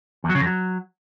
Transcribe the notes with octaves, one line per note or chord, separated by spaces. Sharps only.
E2
F#3
C#3
F2
F#3